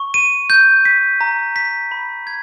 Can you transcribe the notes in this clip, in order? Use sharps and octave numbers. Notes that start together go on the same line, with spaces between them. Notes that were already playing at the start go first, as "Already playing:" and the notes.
Already playing: C#6
D#7
G6
B6
A#5
B6
B5
G#6